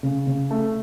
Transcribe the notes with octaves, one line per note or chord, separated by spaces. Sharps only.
C#3
C#3
A3